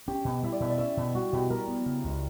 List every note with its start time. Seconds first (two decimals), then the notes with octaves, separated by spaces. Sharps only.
0.08 C#4 G4
0.25 B2
0.43 G3 E4
0.52 D5
0.60 B2 E5
0.70 D5
0.78 C#4 E5
0.97 B2
1.15 G3 F#4
1.33 B2 G4
1.50 G3 A#4
1.68 B3
1.86 C#3
2.04 C#2